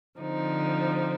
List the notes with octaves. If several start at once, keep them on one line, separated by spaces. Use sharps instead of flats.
D3 F3 C4 D#4